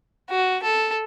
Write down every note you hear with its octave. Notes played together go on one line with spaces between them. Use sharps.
F#4
A4